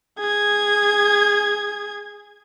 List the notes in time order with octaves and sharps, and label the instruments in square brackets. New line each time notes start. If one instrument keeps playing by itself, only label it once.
[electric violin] G#4 G#6